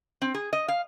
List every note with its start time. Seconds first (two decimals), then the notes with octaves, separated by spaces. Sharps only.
0.22 C4
0.34 G#4
0.53 D#5
0.68 F5